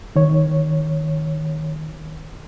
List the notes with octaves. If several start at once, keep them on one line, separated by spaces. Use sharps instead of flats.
D#3 C#5